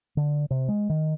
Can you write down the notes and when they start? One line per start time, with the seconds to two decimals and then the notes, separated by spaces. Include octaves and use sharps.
0.17 D3
0.51 C3
0.68 G#3
0.89 D#3